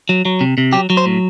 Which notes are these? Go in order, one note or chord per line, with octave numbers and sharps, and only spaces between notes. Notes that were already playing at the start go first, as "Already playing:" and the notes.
F#3
F#3
C3
C3
F#3 G4
F#3
C5
A2